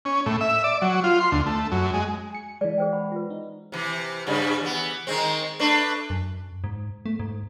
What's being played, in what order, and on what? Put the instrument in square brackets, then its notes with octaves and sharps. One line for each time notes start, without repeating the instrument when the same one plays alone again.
[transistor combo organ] C#4
A2
E5
D5
F#3
F4
C6
D2
A3
F#2
G#3
[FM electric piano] G#5 C#7
[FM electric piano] E3 G#3 [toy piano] D5
[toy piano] G#4 C5 G5
F#5 B5
F4 B4
[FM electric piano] D#4
[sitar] C3 E3
G2 C#3 G3
E3 B3
D#3 G#3 C4
A3 D4 B4
[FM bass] F#2
G#2
A3
G#2